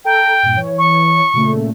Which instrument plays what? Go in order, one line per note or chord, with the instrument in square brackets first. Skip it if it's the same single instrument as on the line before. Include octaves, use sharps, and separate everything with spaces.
[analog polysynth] A4 A#5 [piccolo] G5
[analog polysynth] G2 A#2
E3 C#5
[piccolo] C#6
[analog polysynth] A#2 C#3 A3